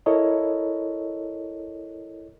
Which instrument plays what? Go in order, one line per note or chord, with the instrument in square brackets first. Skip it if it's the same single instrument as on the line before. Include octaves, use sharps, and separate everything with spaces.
[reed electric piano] E4 A4 A#4 C#5 D#5